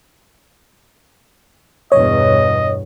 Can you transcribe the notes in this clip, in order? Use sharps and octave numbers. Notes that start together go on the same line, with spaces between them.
E2 G2 B2 C#5 D#5